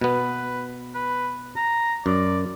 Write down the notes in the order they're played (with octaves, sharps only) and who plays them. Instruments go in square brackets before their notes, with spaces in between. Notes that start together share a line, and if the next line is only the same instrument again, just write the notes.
[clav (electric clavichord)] B2 B3 [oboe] B4
[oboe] B4
A#5
[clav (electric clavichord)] F#2 [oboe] D5